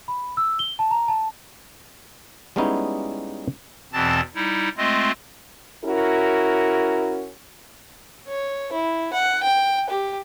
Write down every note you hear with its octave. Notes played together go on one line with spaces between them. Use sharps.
B5
E6
G7
A5
A#5
A5
G3 G#3 B3 C#4 D#4 E4
E2 B2 E3 C4 A5 A6
G3 D#4 E4
G#3 A3 C4 F4 D#5
C#4 E4 F#4 A#4
C#5
E4
F#5
G5
G4